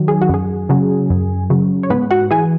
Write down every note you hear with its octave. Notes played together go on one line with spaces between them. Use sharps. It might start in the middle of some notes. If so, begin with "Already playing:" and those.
Already playing: D#3 F#3
G#4
F#4
F#2 G#4
C#3 F#3
F#2
C#3 F#3
C#5
G#2 B3 B4
F#4 F#5
E3 G#4 G#5